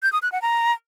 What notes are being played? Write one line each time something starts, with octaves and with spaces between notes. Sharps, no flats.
G6
D#6
F#6
F#5
A#5